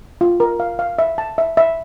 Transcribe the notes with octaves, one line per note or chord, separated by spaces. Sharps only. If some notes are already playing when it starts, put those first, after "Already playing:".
F4
A#4
F5
F5
E5
A5
E5
E5